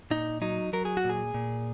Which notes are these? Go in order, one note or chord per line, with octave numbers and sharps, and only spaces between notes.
A#2 D#4
F#3 D#4
F#3 A#4
G#4
F#4
A#2
G#4
A#2